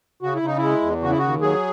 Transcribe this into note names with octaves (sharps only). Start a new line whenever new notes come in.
C#3 F#4
E4
C#3 D#4
G#3 E4
E2
C#3 F#4
E4
D#2 F#4
F#3 G#4